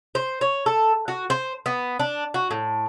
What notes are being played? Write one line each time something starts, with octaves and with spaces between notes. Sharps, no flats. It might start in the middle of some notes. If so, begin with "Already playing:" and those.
C5
C#5
A4
F#4
C5
B3
D4
F#4
A2